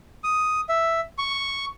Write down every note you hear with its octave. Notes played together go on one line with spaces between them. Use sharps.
D#6
E5
C#6